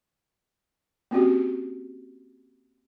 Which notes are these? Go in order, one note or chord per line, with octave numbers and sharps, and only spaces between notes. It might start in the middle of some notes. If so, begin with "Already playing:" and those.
A#3 C4 C#4 F#4 G4